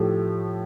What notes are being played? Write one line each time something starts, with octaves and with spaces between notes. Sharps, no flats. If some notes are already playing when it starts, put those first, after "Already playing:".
Already playing: A2 F3 A3 G4